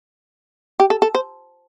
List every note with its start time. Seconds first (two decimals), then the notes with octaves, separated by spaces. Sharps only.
0.80 G4
0.90 A4
1.02 A4
1.15 C5